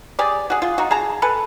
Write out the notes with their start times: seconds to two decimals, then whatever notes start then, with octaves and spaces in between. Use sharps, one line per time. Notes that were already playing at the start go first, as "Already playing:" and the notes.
0.19 G4 G#4 D5
0.50 F#4 G#4
0.62 F4 G#4
0.78 D#4 F#4
0.91 G#4 A5 A#5
1.22 A4 B4 G#5